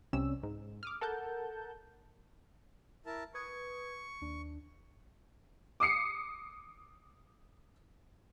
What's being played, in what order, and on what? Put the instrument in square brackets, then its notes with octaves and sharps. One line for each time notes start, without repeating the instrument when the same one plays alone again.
[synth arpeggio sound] C2 C3 G3 C#4 E6
G#2
D6 D#6 F6
A4 A#4 F#5 A5 G6
[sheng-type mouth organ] E4 A#4 A5
[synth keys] B4 D#6 G#6 [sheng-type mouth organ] C#6
[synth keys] D#2 D4
[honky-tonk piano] D6 D#6 C7 C#7